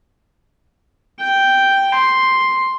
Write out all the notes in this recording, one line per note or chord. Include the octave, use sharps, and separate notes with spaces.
G5
C6